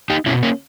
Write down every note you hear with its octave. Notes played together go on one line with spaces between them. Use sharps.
D#4 G4
B2 C#4 E4
A#3 C#4